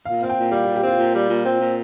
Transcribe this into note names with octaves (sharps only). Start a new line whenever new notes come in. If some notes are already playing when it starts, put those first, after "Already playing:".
A#2 F5
C4 F5
G5
A#2
G3 F5
G4
A#2
G4
C4 F4
A#2
G3
A#2
C4
A#2